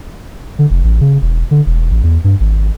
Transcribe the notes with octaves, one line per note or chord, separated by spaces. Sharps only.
D3
F1
A1
C#3
E1
D3
E1
A1
E2
G2
G#1